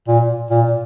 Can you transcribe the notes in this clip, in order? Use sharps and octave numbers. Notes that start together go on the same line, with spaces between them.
A#2
A#2